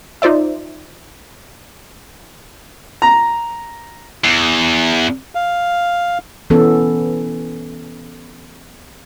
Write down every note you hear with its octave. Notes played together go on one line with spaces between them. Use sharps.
D#4 F4 C5 D5 E5
A#5
E2
F5
E3 B3 C#4 A4